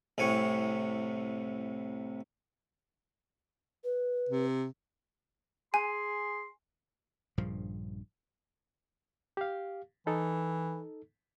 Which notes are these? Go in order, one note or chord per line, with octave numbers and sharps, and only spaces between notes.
C2 A2 C3 G#5 C#6
B4
C3
G#4 G#5 C6
A#1 G2 C#3 F3
G4 F5
E3 D#4 A4